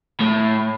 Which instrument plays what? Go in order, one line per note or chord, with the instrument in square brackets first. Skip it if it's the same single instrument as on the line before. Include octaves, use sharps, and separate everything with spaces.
[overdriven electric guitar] A2